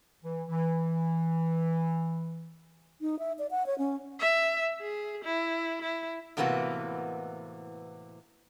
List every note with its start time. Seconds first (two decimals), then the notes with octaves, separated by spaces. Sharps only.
0.24 E3
0.48 E3
3.01 D#4
3.19 E5
3.39 D5
3.51 F#5
3.66 C#5
3.78 C#4
4.20 E5
4.81 G#4
5.24 E4
5.82 E4
6.37 A2 C3 E3 A#3 B3 F#4